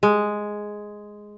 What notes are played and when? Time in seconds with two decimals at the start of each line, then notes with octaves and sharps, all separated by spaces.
0.03 G#3